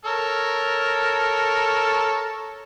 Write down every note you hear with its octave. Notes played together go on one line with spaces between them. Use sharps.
A4 A#4 C#5